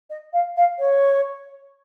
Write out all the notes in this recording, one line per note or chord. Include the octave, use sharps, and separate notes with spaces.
D#5
F5
F5
C#5